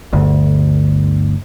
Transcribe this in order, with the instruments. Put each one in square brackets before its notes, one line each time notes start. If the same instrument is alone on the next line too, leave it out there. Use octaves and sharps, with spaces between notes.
[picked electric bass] G1 D2